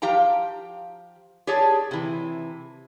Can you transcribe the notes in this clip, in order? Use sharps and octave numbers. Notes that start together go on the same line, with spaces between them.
F3 G4 F5 G5 A#5
G4 G#4 C#5 D5 A5
C3 E3